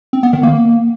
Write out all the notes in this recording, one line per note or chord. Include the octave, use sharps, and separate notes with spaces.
C4
B3
D#3
A#3